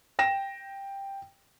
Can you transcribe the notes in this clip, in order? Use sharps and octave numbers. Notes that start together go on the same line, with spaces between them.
G5 A#6 E7